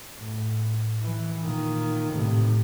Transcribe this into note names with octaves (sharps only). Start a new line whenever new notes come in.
A2
E3
A#2 D#3
A2 C3